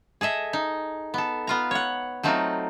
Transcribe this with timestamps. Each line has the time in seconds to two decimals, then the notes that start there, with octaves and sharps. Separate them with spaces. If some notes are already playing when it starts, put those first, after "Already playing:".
0.21 G#4 A4 D#5 E5
0.53 D#4
1.14 B3 A4
1.47 B3 F4 A#5
1.71 C#5 F#5
2.23 F#3 A3 C4 D#4 F4